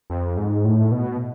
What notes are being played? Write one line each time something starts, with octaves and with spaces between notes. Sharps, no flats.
F2
G#2
A2
B2